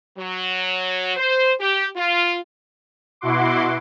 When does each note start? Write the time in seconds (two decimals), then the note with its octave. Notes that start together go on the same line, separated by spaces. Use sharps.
0.17 F#3
1.17 C5
1.60 G4
1.96 F4
3.21 B2 E4 F#4 F#5 C6 D6